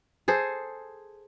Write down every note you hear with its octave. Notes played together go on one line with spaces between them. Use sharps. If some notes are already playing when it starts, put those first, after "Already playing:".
G#4 A4 C5